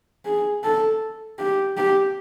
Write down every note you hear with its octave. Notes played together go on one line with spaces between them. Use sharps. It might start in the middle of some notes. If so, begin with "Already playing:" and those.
G#4
A4
G4
G4